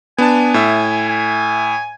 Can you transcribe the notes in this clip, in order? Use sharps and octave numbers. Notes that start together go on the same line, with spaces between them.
B3 D4 G#5 A5
A2 E5
G#5